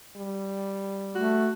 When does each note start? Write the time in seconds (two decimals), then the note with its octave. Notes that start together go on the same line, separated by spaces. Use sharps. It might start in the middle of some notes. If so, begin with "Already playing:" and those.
0.16 G3
1.15 A3 F#4